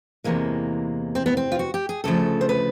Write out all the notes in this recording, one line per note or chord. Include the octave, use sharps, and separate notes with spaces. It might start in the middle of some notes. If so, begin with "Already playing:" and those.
E2 C3 E3 G#3 A#3
C4
B3
C4
F4
F#4
G4
G#4
D2 C#3 F3 A3 A4
C5
B4